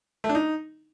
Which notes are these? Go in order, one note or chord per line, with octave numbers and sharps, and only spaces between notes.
A3
D4
D#4